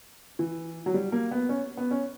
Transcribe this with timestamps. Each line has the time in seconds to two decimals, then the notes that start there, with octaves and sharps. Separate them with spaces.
0.39 E3
0.86 F#3
0.94 G3
1.12 A#3
1.31 B3
1.49 C#4
1.77 B3
1.91 C#4